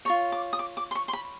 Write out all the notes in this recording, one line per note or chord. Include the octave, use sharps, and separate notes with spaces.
F4 A#4 C#5 C#6
D6
D#6
D6
D6
C6
C#6
C6
B5